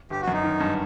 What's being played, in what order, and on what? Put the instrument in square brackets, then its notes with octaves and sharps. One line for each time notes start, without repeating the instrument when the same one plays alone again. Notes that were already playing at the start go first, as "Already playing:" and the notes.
[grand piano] G1 [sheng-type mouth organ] G4
[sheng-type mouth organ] F#4
[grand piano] F#2
[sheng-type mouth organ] D#4
[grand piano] D#3
G2